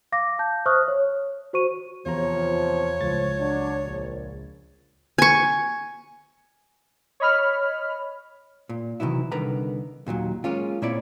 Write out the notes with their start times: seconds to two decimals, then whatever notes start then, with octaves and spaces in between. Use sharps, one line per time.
0.12 F5 D6 A#6
0.39 A5 G6
0.66 C5 E5 C#6 D#6 F6 F#6
0.88 C#5
1.53 F#4 C5 C#6 D#7
2.06 E2 C3 F3 F4 C#5 A#5
3.01 C#2 A2 F3 A6
3.39 F#3 D4
3.85 A#1
5.18 G#5 C#6
7.20 C#5 D#5 B5 F6
8.69 A#2
9.00 C3 D#3 E3 F#3 E4
9.32 C2 D3 D#3 B4 A#5
10.07 D#2 A#2 D3 F#3
10.44 G#3 A#3 C#4 F4
10.82 A#2 A#3 C4 E4 C#5 D5